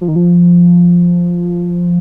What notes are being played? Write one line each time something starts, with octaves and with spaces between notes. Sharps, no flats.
F3
D#3
F3